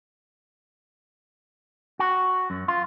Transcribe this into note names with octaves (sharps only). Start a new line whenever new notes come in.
F#4
F#2
F4